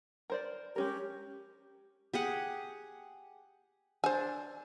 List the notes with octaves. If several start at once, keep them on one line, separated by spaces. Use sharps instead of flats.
A#4 C5 D5
G#3 C#4 G4 A#4
G4 G#4 F#5
D4 C5 G#5